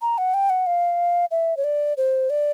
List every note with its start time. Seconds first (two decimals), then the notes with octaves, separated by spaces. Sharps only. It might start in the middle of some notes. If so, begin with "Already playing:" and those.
0.02 A#5
0.18 F#5
0.34 G5
0.50 F#5
0.67 F5
1.31 E5
1.57 C#5
1.64 D5
1.97 C5
2.30 D5